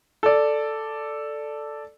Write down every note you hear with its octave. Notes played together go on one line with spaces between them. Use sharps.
A4 D5